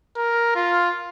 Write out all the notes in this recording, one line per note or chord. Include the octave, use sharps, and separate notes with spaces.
A#4
F4